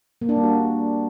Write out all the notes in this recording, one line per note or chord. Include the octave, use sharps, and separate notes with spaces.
A#3
D4
G3
F#4